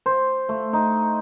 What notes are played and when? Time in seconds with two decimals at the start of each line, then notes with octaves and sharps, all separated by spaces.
0.06 C5
0.49 A3
0.73 D#4